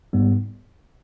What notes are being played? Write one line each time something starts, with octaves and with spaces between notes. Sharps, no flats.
G#2 G3 B3